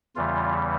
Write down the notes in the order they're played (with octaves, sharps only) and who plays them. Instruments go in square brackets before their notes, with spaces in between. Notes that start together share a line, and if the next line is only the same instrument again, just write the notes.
[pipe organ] E2 C#3 E3 G3 F4